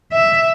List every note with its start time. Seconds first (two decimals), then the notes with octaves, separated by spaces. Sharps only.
0.13 E5